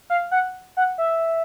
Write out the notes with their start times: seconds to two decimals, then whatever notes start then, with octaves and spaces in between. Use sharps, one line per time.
0.10 F5
0.31 F#5
0.77 F#5
0.98 E5